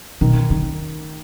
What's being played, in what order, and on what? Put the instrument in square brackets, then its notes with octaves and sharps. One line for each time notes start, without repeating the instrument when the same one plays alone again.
[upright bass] B2 [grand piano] D#3
[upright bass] D3 [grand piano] D#3